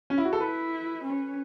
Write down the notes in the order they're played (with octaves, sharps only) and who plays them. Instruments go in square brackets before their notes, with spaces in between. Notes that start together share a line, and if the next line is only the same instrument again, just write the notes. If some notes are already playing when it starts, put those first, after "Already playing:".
[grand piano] C#4
E4
F#4
A4
[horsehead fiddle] E4 [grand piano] B4
[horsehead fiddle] C#4